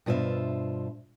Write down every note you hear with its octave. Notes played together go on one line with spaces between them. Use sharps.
G2 B2 F4 C5 E5